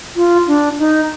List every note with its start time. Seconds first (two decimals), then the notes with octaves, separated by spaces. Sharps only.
0.16 F4
0.48 D4
0.79 D#4